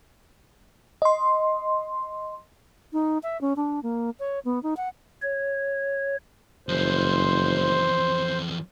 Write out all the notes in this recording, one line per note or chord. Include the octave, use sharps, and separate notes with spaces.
D#5 C6
D#4
E5
C#4
D4
A#3
C#5
B3
D#4
F#5
C#5
F#1 F2 E3 C5